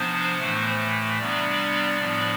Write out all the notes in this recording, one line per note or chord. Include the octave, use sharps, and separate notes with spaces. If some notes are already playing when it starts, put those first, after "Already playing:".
Already playing: C3 F3 B3 D4 C5
A2 E3 A3
C3 G3 B3 D4 D5
A2 F3 B3 D4